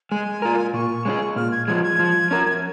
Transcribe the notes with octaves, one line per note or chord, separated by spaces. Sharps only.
G#3 G#5
F4 A#4
A#2 C#6
G#3 C#4 G#4
A#2 F6
G#6
F3 G#3 G#6
G#6
F3
C#4 A#4